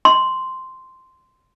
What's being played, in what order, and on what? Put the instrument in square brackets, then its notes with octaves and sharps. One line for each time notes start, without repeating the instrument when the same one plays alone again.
[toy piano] C6